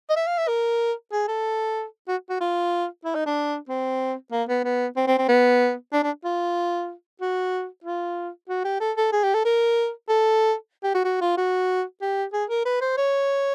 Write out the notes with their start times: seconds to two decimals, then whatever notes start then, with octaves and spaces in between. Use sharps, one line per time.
0.09 D#5
0.16 E5
0.27 F5
0.38 E5
0.48 A#4
1.12 G#4
1.28 A4
2.08 F#4
2.29 F#4
2.40 F4
3.04 E4
3.15 D#4
3.26 D4
3.69 C4
4.32 A#3
4.49 B3
4.64 B3
4.97 C4
5.07 C4
5.18 C4
5.28 B3
5.93 D4
6.03 D4
6.25 F4
7.21 F#4
7.84 F4
8.49 F#4
8.64 G4
8.80 A4
8.97 A4
9.12 G#4
9.23 G4
9.34 A4
9.45 A#4
10.08 A4
10.83 G4
10.94 F#4
11.05 F#4
11.21 F4
11.37 F#4
12.01 G4
12.33 G#4
12.50 A#4
12.65 B4
12.81 C5
12.97 C#5